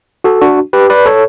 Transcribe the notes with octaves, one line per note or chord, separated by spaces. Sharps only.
F#4 A4
D4 F#4
G4 B4
B4 D5
A4 C#5